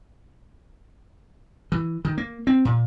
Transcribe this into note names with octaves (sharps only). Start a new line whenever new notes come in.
E3
D#3
A#3
C4
A#2